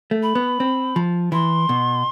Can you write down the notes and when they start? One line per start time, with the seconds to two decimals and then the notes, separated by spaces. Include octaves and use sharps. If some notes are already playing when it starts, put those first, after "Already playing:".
0.11 A3
0.23 B5
0.35 B3
0.60 C4
0.96 F3
1.32 E3 C6
1.69 B2